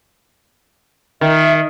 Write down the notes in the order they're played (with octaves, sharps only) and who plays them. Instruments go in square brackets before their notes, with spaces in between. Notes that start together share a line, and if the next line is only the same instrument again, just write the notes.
[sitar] D#3 [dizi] E5